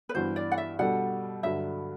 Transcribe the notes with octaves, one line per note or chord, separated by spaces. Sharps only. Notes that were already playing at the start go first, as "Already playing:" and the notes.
B4
G2 E3 B3 F#4 C5
D5
F#5
E5
B2 G3 D4 A4 F#5
G2 D3 F#3 E5